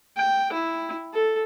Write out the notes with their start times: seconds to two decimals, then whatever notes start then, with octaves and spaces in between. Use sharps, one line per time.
0.17 G5
0.53 E4
1.14 A4